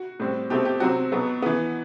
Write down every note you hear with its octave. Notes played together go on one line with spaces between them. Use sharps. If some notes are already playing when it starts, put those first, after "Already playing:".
Already playing: F#4
A2 G3 C4
B2 A3 C4 G4
G4
C3 F#3 C4 F#4
B2 F#3 B3
E3 B3